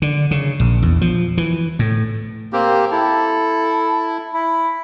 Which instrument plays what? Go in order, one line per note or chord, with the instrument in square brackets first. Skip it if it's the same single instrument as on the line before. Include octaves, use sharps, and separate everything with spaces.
[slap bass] D3
C#3
A#1
E2
F3
E3
A2
[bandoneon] A#3 C4 G4
[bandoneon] E4 [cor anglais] A4
[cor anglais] E4